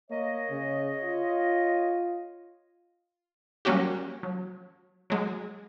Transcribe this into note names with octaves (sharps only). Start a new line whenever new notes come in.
A#3 C#5 D#5
C#3
F4
F#3 G3 A#3 C#4 F#4 G4
F#3
F#3 G#3